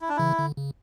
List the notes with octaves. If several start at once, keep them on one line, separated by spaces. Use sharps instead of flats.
E4
D4
C#3 E3 E4
D3
C#3